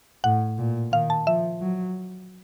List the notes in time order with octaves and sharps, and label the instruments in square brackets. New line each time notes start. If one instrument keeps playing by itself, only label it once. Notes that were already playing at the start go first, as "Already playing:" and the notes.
[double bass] A2 [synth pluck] F#5
[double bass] A#2
[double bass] D#3 [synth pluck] F5
[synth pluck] A5
[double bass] F3 [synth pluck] E5
[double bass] F#3